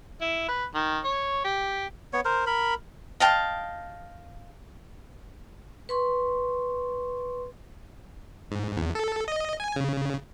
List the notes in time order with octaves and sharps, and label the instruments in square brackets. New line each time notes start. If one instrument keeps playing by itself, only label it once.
[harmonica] E4
B4
D#3
C#5
G4
[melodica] B3 C#5
A#4 C5
A#4 B5
[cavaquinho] D#5 F5 G5 A5
[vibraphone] B4 C6 C#6
[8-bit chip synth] G#2
E2
A4
D#5
G#5
C#3